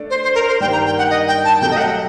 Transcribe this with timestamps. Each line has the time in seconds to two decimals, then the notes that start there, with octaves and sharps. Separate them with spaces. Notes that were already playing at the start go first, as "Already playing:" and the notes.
Already playing: A3 D4 A4 D5
0.10 C5
0.23 C5
0.35 A#4
0.47 C5
0.60 G2 D#3 G3 A#3 D4 G5
0.72 A#5
0.86 G5
0.98 F#5
1.10 D#5
1.28 G5
1.45 A5
1.61 C3 F#3 A3 G5
1.71 D#5
1.77 F#5